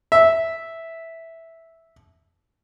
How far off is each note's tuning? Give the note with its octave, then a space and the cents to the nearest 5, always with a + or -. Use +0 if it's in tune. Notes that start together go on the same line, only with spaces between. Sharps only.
E5 -5